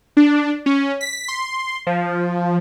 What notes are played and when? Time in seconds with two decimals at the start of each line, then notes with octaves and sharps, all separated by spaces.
0.17 D4
0.66 C#4
1.01 B6
1.28 C6
1.87 F3